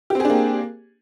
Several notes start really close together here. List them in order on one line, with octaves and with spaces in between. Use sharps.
G4 C4 G#4 D4 A#3